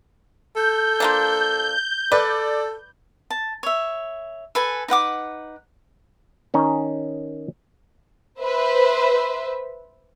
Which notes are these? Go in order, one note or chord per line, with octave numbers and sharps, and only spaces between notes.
A4 G6
F3 A#3 D4
A4 B4 D5
A5
C#5 E5
A4 B4 G#5
D#4 B4 F#5 D6
D#3 C#4 D#4
B4 C5 E5